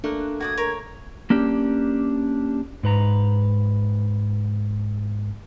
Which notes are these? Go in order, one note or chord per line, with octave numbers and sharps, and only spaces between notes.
A3 A#3 D4 F#6
F#4 D5 D#6 G#6
A#4 C#5
A#3 C#4 D4 G4
G#2 B4 A#5